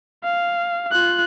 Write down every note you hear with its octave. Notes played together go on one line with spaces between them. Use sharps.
F5
F4 F#6